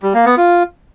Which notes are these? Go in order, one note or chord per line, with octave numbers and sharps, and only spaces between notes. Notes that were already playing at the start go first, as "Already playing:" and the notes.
G3
A#3
B3
F4